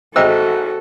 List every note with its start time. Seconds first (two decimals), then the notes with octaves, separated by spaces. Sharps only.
0.16 G#1 D#4 F#4 A4 C5 E5 G5 E6